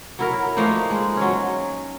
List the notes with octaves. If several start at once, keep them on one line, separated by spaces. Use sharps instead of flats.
F#3 E4 A#4
F3 A3 A#3 D#4
G#3
F#3 C#4